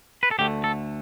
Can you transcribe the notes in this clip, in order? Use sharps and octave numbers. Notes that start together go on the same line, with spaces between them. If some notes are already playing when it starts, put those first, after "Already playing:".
B4
A4
D2 D3 A3 G4
A4